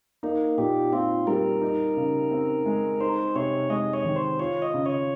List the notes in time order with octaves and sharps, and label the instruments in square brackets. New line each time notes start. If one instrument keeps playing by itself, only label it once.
[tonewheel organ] A#3 [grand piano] D#4
[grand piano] A#2 [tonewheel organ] G4
[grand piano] C4 [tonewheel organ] F4
[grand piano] G3 [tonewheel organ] A#4
[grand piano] D#4
C#3
C4
G#3
[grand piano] D#4 [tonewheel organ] C5
[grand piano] C3 [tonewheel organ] C#5
[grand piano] G#3 [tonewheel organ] D#5
[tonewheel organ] C#5
[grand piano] D#3
[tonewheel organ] C5
[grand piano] F4 [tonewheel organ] C#5
[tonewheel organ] D#5
[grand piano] C#3
[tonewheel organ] C#5